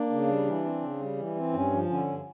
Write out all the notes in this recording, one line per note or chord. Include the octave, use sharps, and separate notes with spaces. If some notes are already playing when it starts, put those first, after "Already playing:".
Already playing: A#3 D4
C#3
G3
E3
C4
C#3
G3
E3
C4
G2 C#4
F3
D3 C#4
G2